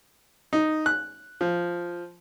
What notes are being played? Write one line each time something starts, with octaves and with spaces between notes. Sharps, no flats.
D#4
F#6
F3